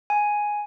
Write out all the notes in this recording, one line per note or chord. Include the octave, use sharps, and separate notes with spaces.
G#5